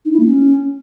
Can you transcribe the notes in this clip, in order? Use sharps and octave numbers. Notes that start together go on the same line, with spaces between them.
D#4
E4
A#3
C#4